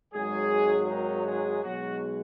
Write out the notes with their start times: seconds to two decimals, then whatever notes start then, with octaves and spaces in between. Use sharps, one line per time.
0.13 G#1 G#2 F#3 G#3 G#4
0.88 D#3 D#4
1.26 G#3 G#4
1.63 B1 B2 F#3 G#3 F#4